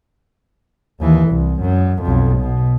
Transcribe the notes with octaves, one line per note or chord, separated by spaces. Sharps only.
D#2 E3
C2
F#2
B1 F2
B2